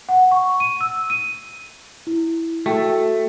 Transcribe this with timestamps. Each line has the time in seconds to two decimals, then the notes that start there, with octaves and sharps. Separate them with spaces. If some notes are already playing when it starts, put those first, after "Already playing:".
0.09 F#5
0.31 C#6
0.60 D#7
0.81 E6
1.10 D#7
2.07 E4
2.66 A3 F#4 G5